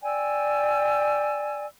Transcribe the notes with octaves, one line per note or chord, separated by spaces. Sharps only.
D5 G5 G#5 E6